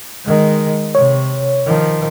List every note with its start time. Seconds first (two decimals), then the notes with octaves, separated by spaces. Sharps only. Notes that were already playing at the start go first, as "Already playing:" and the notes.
0.25 D#3 G#3
0.95 C3 C#5
1.66 D#3 F3